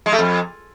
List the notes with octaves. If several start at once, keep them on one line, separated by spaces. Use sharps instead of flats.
G#3
A3
F2